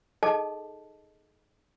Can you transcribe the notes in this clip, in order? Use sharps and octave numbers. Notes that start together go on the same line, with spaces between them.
D#4 G#4 A4 D#5 A5